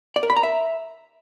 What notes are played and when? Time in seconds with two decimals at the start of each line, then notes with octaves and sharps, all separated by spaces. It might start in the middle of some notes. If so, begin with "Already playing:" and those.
0.16 D5
0.23 A#4
0.30 B5
0.37 A#5
0.43 E5